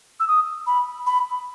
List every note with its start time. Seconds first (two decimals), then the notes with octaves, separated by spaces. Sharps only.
0.20 E6
0.28 D#6
0.67 B5
1.07 B5